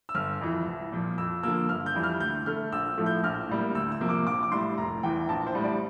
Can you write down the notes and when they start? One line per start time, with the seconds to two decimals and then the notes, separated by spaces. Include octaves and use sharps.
0.09 E6
0.15 G1 F6
0.41 F2 E3
0.66 C2
0.92 A#2 F3
1.18 F2 E6
1.43 D3 F3 A#3 E6
1.69 G1 F6
1.86 G6
1.95 F2 E3 G3
2.03 F6
2.20 D2 G6
2.46 D3 A3 F6
2.72 A#1 E6
2.97 A2 F3 A3
3.06 G6
3.23 A#1 F6
3.49 A2 G3 A#3
3.75 D2 E6
3.92 E6
4.00 C3 F3 A#3
4.09 D6
4.26 A#1 D6
4.43 D6
4.52 A2 G3 C6
4.78 F1 A#5
5.03 E2 E3 G5
5.29 A#1 A5
5.46 C5
5.55 A2 G3
5.63 D5